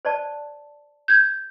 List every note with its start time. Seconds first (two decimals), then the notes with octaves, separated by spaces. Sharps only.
0.05 C5 D5 A5
1.08 G6 G#6